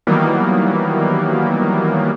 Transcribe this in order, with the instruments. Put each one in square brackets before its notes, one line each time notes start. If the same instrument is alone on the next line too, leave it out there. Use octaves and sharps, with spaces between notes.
[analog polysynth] D#3 E3 F#3 G3 A#3 B3